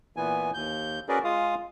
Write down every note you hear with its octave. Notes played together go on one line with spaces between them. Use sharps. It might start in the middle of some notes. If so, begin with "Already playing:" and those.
A#2 E3 B3 G#5
D#2 G6
C#4 F#4 G#4 A#4 B4 D5
G#3 F4 F5 D#6